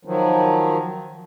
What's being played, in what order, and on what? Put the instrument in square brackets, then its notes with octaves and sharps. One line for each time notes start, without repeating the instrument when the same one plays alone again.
[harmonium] D#3 F3 F#3